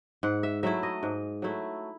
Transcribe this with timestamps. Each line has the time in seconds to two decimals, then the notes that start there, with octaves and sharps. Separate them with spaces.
0.23 G#2 F#5
0.43 E5
0.63 F#3 A3 E4 E5
0.83 D#5
1.03 G#2
1.42 F#3 A3 E4